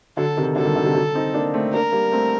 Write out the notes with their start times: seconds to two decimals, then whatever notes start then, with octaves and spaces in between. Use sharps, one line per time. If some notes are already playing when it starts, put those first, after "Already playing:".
0.17 D3 F#3 A4
0.37 C3 D#3
0.56 D3 F#3 A4
0.65 D#3 G3
0.76 D3 F#3
0.85 C3 D#3
0.95 D3 F#3
1.15 C4 D#4
1.34 A#3 D4
1.54 A3 C4
1.73 A#3 D4 A#4
1.92 G3 A#3
2.12 A3 C4